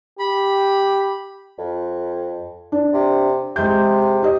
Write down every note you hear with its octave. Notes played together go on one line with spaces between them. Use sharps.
G4 B5
F2
D4
C3
C3 G#3 G6
G4 D#5